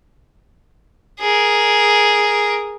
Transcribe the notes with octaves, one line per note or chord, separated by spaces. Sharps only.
G#4 A#4